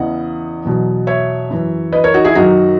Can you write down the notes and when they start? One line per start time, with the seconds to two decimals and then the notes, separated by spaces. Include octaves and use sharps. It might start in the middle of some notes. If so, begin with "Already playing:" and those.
Already playing: E2 C#3 E3 D#5 F#5
0.65 E2 B2 F#3
1.07 C#5 E5
1.50 F#2 E3
1.92 B4 D#5
2.04 A#4 C#5
2.14 D#4 F#4
2.25 E4 G#4
2.35 F#2 D#3 F#3 D#4 F#4